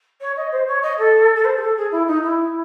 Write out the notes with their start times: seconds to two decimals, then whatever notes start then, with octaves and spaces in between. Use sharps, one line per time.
0.20 C#5
0.36 D#5
0.51 C5
0.67 C#5
0.82 D#5
0.98 A4
1.35 A4
1.44 C5
1.56 G#4
1.61 A4
1.76 G#4
1.91 E4
2.07 D#4
2.23 E4